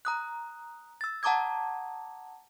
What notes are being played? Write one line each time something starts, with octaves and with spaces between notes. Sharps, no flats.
A#5 D#6 F#6
E6 A6
F#5 A5 A#5 D6 D#6 G#6